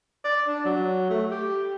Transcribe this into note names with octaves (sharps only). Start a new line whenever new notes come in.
D5
D4
F#3
A3
G4